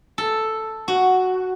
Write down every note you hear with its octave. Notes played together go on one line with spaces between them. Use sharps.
A4
F#4